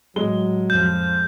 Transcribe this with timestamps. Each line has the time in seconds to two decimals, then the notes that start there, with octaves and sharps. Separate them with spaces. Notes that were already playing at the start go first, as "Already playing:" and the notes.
0.16 A2 F#3 G#3 G7
0.70 F2 F3 G6